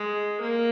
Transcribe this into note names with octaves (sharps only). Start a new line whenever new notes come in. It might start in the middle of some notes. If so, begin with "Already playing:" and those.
Already playing: G#3
A#3